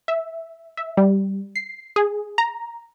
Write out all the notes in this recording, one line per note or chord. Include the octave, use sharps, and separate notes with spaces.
E5
E5
G3
C7
G#4
A#5